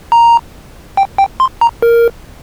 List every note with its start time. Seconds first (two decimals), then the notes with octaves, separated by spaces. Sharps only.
0.12 A#5
0.97 G5
1.18 G5
1.40 C6
1.61 A#5
1.82 A#4